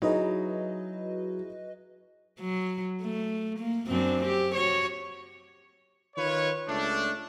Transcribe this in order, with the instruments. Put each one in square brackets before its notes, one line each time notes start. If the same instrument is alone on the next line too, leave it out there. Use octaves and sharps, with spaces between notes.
[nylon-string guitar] F#3 [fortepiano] D#4 [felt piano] E4 G#4 [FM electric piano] F#4 B4 D#5
[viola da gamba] F#3
A3
A#3
F#2 C4 D4
G4
F#4 C#5
[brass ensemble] D#3 F4 B4 C#5
C#2 A3 D4